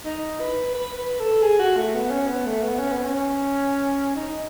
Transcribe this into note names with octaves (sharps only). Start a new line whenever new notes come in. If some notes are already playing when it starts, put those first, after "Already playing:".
D#4
B4
B4
B4
A4
G#4
F#4
A3
B3
C#4
B3
A3
B3
C#4
B3
C#4
D#4